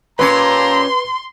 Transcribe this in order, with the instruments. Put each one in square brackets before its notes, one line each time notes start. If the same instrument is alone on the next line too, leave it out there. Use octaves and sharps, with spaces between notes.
[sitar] A#2 C#4 C#5 [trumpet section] G4 A5 A#5 [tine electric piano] B4 [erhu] C6